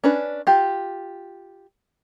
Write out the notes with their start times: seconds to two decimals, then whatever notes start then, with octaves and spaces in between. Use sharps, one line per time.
0.04 C#4 D4 B4
0.47 F4 G4